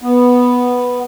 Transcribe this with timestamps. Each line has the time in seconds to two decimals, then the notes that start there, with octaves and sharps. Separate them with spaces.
0.02 B3